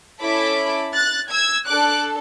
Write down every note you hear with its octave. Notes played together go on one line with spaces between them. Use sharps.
C#4 E4 A4 B5 D6
F#6 A6
E6 G#6
D4 A4 D6 F#6